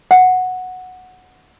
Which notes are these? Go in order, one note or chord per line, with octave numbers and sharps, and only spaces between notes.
F#5